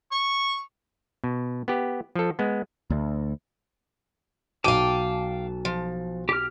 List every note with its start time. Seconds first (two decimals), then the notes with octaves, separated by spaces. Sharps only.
0.11 C#6
1.24 B2
1.68 B3 G4
2.16 F3 A4
2.39 G#3 B3
2.90 D2
4.64 B1 F#3 F5 G5 A5 D6 D#7
5.65 F3
6.29 G4 F6